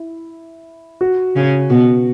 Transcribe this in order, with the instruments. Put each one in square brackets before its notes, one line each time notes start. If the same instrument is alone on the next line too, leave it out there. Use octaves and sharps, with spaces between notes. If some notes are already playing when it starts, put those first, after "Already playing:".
Already playing: [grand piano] E4
F#4
[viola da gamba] C#3 C#4
[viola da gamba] B2 B3 [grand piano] F#4